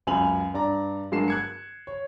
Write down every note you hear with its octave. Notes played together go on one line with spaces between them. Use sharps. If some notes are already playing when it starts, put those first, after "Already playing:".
C#2 F#2 G#5 B5 F7 F#7
G2 D5 A#5
G2 F#3 G#3 A#4 C7 E7
F#6 G#6 C#7
C#5